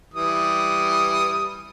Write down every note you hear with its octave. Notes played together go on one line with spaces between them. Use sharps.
E3 G3 D#6